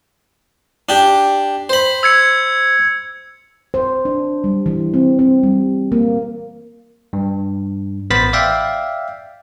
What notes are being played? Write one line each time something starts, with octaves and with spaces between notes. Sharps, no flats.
D4 G4
C5 B5
E6 G#6 C#7
C5
D4
G3
E3
C4
C4
G3
A#3
G2
A1 B3 C5 B5 A6 B6
D5 E5 F5 G5